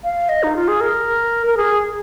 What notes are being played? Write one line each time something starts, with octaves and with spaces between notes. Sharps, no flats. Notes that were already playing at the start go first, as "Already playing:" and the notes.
F5
D#5
D#4
F4
G#4
A#4
A#4
G#4